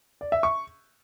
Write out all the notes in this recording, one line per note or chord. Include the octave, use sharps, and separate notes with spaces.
D5
E5
C#6